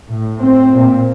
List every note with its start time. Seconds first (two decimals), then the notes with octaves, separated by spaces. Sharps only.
0.10 A2
0.40 C4
0.71 A#2